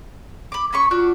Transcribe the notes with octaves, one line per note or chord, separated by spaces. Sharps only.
B5 D6
C#4 B5 C#6
D4 F4 F#4 D5